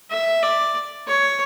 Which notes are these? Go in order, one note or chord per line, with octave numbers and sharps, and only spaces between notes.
E5
D5
C#5